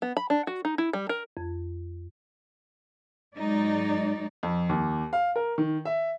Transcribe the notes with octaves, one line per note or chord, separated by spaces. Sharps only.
B3
B5
D4
F#4
D#4
E4
G3
A#4
F2
G#2 F#3 G#3 D#4 D5
F2
D#2
F5
A#4
D#3
E5